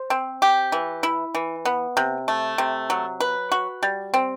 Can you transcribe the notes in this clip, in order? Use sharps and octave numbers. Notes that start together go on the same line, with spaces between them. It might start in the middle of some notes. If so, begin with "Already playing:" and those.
Already playing: C5
C4
G4
E3
E4
E3
B3
C3
A3
C3
F#3
B4
F#4
G3
C4